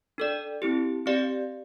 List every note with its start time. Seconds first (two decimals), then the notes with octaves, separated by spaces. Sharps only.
0.18 D4 A4 D5
0.62 C4 E4 G4
1.06 C4 G4 D5 F5